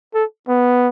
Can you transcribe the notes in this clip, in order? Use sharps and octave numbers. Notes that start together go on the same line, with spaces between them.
A4
B3